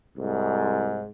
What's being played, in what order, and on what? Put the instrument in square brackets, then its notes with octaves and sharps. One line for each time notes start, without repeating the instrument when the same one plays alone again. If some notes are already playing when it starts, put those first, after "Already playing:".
[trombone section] C2 G#2